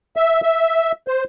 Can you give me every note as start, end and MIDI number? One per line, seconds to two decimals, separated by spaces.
0.16 0.41 76
0.43 0.92 76
1.08 1.24 72